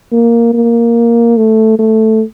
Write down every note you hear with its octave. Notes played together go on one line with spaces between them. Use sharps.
A#3
A#3
A3
A3